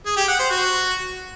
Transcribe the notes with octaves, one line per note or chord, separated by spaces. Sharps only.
G#4
G4
F#5
C5
F#4